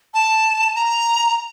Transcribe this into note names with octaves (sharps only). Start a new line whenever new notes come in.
A5
A#5